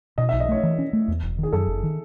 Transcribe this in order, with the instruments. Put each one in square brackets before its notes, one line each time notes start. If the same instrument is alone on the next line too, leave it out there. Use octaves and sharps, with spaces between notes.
[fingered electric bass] B2 [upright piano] D#5
[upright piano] E5
[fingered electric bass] B1
[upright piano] D#5
[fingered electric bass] A3 [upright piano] C#5
[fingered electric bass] E3
C#4
A3
E2
E1
[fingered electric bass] D#3 [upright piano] G#4
[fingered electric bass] F#2 [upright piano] A4
[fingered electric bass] F#1
D#3